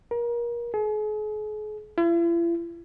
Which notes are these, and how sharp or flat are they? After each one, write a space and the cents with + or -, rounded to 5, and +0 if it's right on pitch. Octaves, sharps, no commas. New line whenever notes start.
A#4 +30
G#4 +40
E4 +45